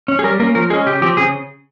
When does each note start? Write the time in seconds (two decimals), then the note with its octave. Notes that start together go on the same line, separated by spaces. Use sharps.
0.08 C#4
0.19 G#4
0.24 G3 A#4
0.40 A#3 C#4 A#4
0.55 F3 A#4
0.70 G#3 C#4 G#4
0.86 C#3 G4
1.02 F3 C4 G4
1.17 C#3 G#4